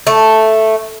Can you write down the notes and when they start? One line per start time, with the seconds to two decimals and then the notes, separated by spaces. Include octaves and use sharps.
0.07 A3